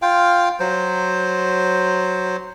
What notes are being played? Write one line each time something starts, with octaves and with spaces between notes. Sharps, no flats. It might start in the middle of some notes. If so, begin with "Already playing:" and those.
F4 F5 G5
F#3 C5